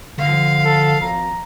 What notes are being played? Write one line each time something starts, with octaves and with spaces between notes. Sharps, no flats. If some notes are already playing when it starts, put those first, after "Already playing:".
D3 F3 F5
A4
G#1 A#5